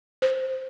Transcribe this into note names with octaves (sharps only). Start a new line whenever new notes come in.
C5